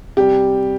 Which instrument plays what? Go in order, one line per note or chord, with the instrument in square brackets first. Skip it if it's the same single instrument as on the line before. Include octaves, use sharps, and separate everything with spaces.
[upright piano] C3 G3 G4